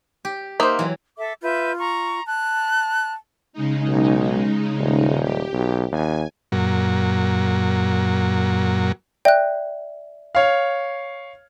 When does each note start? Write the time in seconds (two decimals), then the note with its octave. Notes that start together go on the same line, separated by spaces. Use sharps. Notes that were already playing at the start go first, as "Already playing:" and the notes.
0.25 G4
0.60 A#3 D#4 C5 E5
0.79 E3 F#3
1.17 A4 E5 D6
1.42 F4 B4 E5 G6
1.78 A#5 C#6
2.26 A5 F#6
3.53 C#3 G#3 D#4
3.88 B1
4.78 D#1
5.22 G4
5.53 B1
5.92 D#2 G#5
6.52 F#2 A#2 F#3
9.25 D5 E5 G5 F#6
10.35 C#5 F5